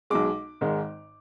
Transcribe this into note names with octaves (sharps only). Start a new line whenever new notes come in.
B1 B2 G#3 D6
G#1 G#2 D#3 G#3